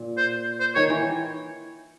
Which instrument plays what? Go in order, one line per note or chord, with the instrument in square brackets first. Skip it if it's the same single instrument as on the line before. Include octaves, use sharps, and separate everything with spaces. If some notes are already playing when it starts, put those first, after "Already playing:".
Already playing: [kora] A#2
[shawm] C5
C5
[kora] D#3 [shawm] C#5
[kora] E3